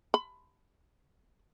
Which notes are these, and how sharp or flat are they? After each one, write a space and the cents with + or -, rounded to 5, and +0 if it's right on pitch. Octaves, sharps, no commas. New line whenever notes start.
B5 +15